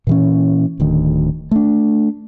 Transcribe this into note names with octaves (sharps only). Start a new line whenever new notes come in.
A#2 E3 C#4
D1 D2 D#3
A3 D4